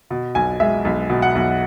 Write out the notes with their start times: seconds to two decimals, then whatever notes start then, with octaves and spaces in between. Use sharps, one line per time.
0.11 B2
0.35 B1 G#5
0.60 G#3 E5
0.85 B1
1.10 B2
1.22 F#5
1.35 B1